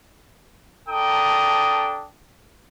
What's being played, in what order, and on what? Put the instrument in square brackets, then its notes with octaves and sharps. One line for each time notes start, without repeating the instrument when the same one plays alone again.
[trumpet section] D4 A4 G5 A#5 D#6